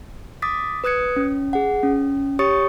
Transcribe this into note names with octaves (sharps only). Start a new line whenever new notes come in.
D6 D#6 A6 B6
B4 D#6 F#6 G#6 C#7
C#4
G#4 F#5
C#4
G4 C#5 C#6 D#6 A6 C#7